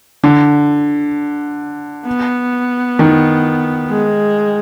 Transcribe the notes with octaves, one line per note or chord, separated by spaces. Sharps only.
D3
B3
D#3
G#3